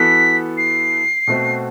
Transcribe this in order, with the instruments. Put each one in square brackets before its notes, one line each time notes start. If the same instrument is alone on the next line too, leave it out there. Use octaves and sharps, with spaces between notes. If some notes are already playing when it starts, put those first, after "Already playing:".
Already playing: [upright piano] E3 B3 F#4 A4 [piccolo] B6
[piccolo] C7
[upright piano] B2 A3 C4 F#4